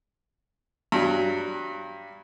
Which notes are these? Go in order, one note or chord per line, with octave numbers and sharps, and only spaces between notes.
G2 F#3